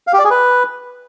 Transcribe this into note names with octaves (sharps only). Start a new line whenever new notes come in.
F5
G4
D5
G#4
B4